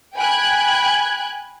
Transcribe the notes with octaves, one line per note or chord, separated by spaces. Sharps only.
G5 G#5 B5 F#6 G#6